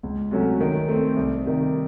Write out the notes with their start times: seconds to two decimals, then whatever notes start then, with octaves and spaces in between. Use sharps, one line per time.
0.03 C#2
0.31 C3 F#3 A3 C#4
0.61 D#3
0.88 A3 C4
1.17 C2
1.45 C3 D#3